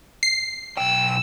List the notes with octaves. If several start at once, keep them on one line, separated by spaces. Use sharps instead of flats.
C7
B1 G5 E6